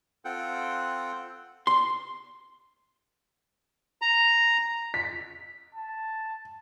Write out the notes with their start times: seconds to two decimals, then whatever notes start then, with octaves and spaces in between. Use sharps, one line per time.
0.25 C4 F4 A4 F#5 G5
1.67 C6
4.02 A#5
4.94 B6
5.75 A5